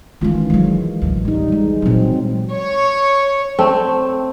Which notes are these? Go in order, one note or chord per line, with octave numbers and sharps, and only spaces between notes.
D#3 E3 G#3 C#4 F4
D#3 F#3 G#3
A1 D2
G3 D#4
E3 G#3
A#2 F#3 C4 F4
C#5
A3 C4